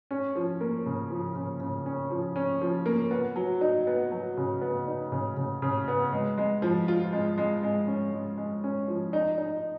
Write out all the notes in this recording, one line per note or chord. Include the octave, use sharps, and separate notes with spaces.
C#4
F3
A#3
C#3
F3
C#3
C#3
C#4
F3
C#4
F3
A#3
B3
F#3
D#4
B3
F#3
C#3
B3
D#4
C#3
C#3
C#3
B3
G#3
G#3
F3
F4
G#3
G#3
G#3
C#4
G#3
G#3
C#4
F3
D#4
D#4